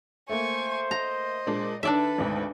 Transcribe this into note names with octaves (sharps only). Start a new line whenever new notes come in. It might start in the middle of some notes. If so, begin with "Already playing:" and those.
A3 A#3 C5 G#5 C#6
D#5 A#5
A#2 G#3 D4
D#3 D4 A4 B4 D5 E5
G#1 D2 G#2